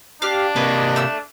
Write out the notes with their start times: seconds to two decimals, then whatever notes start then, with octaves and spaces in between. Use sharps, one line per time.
0.22 D4 G4 F5
0.56 C3 A#3 B4 C#5 D#5
0.96 A3 E6